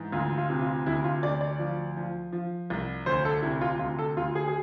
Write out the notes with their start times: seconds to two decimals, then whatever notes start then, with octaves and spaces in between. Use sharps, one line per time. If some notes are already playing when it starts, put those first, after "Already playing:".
Already playing: G#2 E3
0.12 D2 F4
0.38 F4
0.50 C3
0.62 F4
0.86 D2 E4
1.04 F4
1.23 D2 D5
1.41 D5
1.59 F3
1.97 F3
2.32 F3
2.70 C2
3.06 D2 C5
3.25 A4
3.42 C3 E4
3.61 F4
3.79 D2 F4
3.98 A4
4.17 D2 F4
4.35 G#4
4.48 G#4